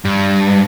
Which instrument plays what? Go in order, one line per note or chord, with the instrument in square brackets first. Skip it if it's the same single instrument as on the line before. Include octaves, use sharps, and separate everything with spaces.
[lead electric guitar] G2